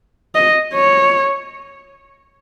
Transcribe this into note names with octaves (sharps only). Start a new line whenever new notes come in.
D#5
C#5